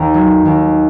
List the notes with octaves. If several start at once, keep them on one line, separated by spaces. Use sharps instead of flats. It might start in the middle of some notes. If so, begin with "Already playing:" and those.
Already playing: D#2 A#5
F#3
D#2